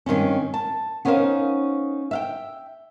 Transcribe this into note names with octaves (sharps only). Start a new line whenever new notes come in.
G2 D#3 C4 C#4
A5
B3 C#4 D#4 A#4 C5 F5
E5 F5 G5